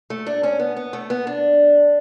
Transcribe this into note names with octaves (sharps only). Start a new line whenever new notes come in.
A3
D4
C#4
B3
B3
A3
B3
D4